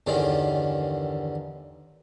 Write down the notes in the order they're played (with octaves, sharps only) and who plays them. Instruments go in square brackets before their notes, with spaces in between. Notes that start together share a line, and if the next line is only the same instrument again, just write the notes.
[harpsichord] E2 G2 D3 D#3 C#4